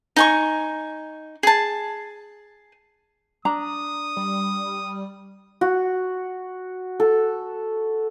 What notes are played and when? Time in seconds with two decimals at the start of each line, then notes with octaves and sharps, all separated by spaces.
0.16 D#4 G#5 C#6
1.43 G#4 A5
3.45 D4 A#5 D#6
4.17 G3
5.61 F#4
7.00 A4